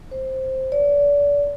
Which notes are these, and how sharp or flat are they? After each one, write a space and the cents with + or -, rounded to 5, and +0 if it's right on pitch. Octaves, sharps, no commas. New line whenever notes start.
C5 +10
D5 -35